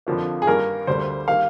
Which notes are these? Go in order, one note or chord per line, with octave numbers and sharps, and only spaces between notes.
F2 D3 F3 A#3
G#4
G2 D#3 A#3 A#4
D2 D3 G3 A#3 C5
D#3 G3 A#3 F5